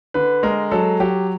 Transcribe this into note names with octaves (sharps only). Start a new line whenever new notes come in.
D3 B4
G#3 A#4
F#3 A4
F#3 G4